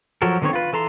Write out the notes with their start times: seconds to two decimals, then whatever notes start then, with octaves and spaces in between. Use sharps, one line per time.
0.22 F3 F#3 F#4 A4 A#4
0.42 D3 D#3 B3 C4 C#5
0.53 F4 B4
0.73 E3 A4 A#5 C6